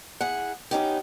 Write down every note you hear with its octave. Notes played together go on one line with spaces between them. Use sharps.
E4 G#4 F#5
B3 C#4 D#4 G4